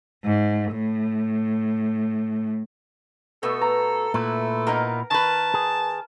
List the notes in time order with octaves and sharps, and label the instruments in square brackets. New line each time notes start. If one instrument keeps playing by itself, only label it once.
[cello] G#2
A2
[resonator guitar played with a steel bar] B2 A3 [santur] B3 [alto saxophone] A4
[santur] A#5
[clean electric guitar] A#2 E4 [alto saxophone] A3 [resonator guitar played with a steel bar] B4
[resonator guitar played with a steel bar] A#3 B3 D#4 [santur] A#4
[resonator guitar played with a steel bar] D#3 B4 [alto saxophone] A5
[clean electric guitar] G#4